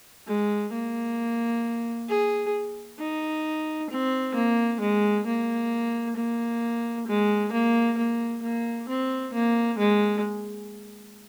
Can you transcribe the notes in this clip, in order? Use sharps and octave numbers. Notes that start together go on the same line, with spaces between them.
G#3
A#3
G#4
D#4
C4
A#3
G#3
A#3
A#3
G#3
A#3
A#3
A#3
C4
A#3
G#3